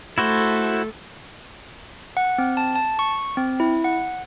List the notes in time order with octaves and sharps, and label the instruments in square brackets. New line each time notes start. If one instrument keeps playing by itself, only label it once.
[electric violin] A3 A4 [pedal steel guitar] E4 F#4 C5
[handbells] F#5
C4
A5
A5
C#6
C4
E4
F#5